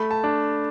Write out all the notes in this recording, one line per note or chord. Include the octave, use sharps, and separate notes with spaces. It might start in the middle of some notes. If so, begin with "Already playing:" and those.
Already playing: A3 B5
A5
D4